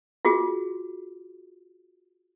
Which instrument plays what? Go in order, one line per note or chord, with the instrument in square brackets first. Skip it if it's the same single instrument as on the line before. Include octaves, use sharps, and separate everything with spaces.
[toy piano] F4 F#4 G#4